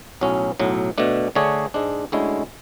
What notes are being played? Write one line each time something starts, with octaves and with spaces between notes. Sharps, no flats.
B1 A2 F#3 C#4
B1 A2 F#3
B2 A3 D4
D3 A3 D4 G#4 C#5
G#2 G#3 D4
D2 D3 G#3 C#4 E4